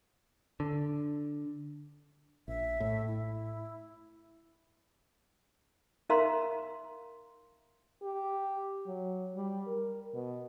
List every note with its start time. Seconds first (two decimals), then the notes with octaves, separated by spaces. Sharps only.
0.60 D3
2.48 A#1 E5
2.80 A2
3.07 E4
6.09 D#4 A#4 E5 F5 A#5 C6
8.03 G4
8.87 F#3
9.36 G3
9.67 A#4
10.14 B2